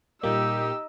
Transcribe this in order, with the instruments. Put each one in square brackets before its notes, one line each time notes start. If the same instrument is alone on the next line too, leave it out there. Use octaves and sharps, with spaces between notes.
[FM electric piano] A#2 G3 A#3 [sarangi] D#4 [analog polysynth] G4 [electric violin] E6